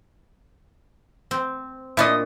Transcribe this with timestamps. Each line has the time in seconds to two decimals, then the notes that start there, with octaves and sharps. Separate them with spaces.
1.31 C4
1.97 A#2 D4 E4 D#5